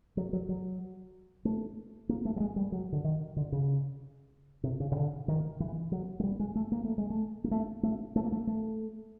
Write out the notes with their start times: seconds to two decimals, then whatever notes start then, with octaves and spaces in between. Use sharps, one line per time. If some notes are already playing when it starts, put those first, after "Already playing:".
0.17 F#3
0.33 F#3
0.49 F#3
1.45 A3
2.09 A#3
2.25 A3
2.36 G3
2.40 G#3
2.56 G3
2.72 F#3
2.92 D3
3.04 D#3
3.36 D3
3.52 C#3
4.64 C3
4.80 C#3
4.92 C#3
4.96 D3
5.28 D#3
5.60 E3
5.92 F#3
6.20 G#3
6.24 G3
6.40 G#3
6.55 A3
6.72 A#3
6.85 A3
6.98 G#3
7.10 A3
7.44 A#3
7.51 A3
7.83 A3
8.16 A3
8.24 A#3
8.32 A3
8.47 A3